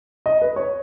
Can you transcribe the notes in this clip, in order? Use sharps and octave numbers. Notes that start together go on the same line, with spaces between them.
D#5
B4
C#5